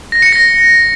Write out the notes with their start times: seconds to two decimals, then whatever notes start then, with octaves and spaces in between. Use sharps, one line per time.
0.12 A#6
0.22 C#7
0.33 A#6